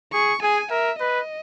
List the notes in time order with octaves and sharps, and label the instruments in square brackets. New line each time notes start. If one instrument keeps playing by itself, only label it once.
[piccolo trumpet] G#4 [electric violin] C#6
[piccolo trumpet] G#4 [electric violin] G#5
[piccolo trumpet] A#4 [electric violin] E5
[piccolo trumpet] B4 [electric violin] D#5